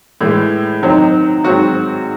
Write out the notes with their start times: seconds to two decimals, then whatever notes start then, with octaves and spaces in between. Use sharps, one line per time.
0.21 A2 E3 G#3
0.82 D#3 F#3 C4 D#4
1.44 G#2 D#3 F#3 C4 F#4